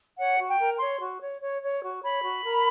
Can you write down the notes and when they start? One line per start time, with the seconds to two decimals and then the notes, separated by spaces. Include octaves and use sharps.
0.17 C#5 F#5
0.38 F#4
0.48 G5
0.58 A#4
0.78 C#5 C6
1.00 F#4
1.20 C#5
1.40 C#5
1.61 C#5
1.82 F#4
2.02 C#5 B5
2.22 F#4
2.43 A#4